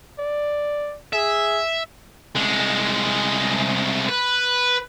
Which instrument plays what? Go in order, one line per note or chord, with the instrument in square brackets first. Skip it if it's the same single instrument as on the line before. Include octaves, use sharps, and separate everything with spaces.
[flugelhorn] D5
[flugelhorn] G#4 [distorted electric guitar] E5
[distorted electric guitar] C2 G#3
B4